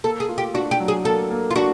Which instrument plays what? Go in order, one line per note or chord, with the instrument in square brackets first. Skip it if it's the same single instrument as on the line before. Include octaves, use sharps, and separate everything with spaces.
[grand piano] A#3 [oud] A4
[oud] G#4
[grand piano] F4
[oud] G4
[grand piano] D4 [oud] F#4
[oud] G4
[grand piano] F#3
[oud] G#4
[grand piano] A#3 [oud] A4
[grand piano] A#3
[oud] F4
[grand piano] D4 [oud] F#4